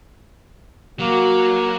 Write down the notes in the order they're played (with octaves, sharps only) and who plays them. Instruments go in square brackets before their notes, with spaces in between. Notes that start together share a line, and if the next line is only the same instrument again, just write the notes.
[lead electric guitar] F#3 [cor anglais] A#3 [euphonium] F#4